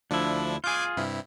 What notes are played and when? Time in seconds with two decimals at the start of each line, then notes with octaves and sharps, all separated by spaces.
0.11 D2 F3 D4 E4
0.64 F4 G#4 G#5 D6 G6
0.97 G2 C3 E4